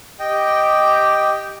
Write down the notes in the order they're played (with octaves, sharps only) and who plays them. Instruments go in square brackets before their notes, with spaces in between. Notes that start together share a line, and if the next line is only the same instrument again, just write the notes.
[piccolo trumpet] G4 [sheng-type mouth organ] D#5 G5